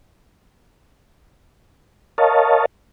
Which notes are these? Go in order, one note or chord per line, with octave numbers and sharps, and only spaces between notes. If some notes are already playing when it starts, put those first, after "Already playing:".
A#4 C#5 D#5 F5 A5